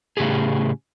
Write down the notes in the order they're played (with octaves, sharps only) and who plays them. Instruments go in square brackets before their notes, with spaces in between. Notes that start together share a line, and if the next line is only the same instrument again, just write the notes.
[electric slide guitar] A2 C#3 C#4 G4 G#4